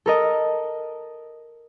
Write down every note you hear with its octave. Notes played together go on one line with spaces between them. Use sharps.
A4 A#4 D#5